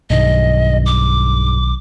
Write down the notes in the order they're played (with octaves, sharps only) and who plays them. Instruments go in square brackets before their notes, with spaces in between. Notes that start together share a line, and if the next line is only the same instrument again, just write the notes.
[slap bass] B1 D#3 [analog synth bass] G2 [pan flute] D#5
[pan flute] D6